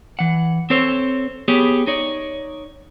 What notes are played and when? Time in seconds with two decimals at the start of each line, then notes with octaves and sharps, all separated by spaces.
0.19 E3 F#5
0.70 C4 A4 C5 C#5
1.48 B3 G4 G#4 C#5
1.87 D#4 C#5 D5